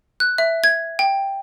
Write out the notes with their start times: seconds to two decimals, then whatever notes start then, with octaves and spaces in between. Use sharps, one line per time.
0.20 F#6
0.38 E5
0.64 G#6
0.99 G5